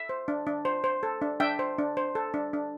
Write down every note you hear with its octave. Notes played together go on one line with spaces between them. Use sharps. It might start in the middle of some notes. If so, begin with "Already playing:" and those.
Already playing: E5
C5
D4
D4
C5
C5
A4
D4
D4 E5 G5
C5
D4
C5
A4
D4
D4